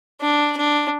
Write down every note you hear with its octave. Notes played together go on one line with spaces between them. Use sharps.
D4
D4